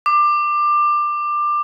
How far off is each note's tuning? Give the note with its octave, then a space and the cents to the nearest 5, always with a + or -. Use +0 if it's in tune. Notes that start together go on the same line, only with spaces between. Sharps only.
D6 +20